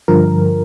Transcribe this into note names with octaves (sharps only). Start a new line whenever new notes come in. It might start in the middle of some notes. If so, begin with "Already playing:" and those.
G2 D3 F3 A#4